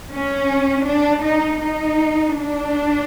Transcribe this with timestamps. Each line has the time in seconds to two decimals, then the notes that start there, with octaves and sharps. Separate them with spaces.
0.11 C#4
0.86 D4
1.24 D#4
1.62 D#4
2.38 D4